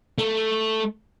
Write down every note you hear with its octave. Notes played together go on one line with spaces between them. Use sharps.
A3